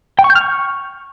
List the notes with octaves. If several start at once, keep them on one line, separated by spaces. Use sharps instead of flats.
G5
C#6
G6
F6
C#6